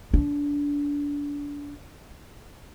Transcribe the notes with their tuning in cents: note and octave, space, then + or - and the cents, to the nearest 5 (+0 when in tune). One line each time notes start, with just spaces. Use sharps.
D4 -25